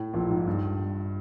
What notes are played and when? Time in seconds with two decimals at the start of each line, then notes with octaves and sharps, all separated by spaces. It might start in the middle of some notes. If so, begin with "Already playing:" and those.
Already playing: A2
0.13 A#1 A#2
0.30 G#2
0.47 G2